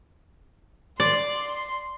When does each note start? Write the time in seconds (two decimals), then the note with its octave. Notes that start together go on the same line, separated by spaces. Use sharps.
1.00 D5 C6